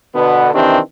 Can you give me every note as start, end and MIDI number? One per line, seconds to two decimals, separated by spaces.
0.15 0.50 47
0.15 0.50 50
0.15 0.50 59
0.54 0.79 48
0.54 0.79 51
0.54 0.79 52
0.54 0.79 60
0.54 0.79 62
0.54 0.79 67